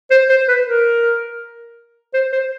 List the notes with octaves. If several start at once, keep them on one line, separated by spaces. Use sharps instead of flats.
C5
C5
B4
A#4
C5
C5